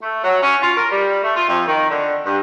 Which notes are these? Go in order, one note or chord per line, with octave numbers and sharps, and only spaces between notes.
A3
F#3
C#4
F4
A#4
G3
A3
F4
F2
D#3
D3
G2